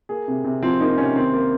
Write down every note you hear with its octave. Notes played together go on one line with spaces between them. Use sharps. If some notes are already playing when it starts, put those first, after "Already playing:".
A#3 G#4
C3
C3
F3 C4
A#3 D#4
C3 C#4
D#3 C4
A#3